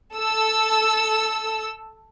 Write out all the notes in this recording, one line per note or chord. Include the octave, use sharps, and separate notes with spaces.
A4 E6